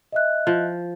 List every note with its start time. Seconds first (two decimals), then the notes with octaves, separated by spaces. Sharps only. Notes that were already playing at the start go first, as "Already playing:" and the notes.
0.12 D#5 E5 F#6
0.47 F3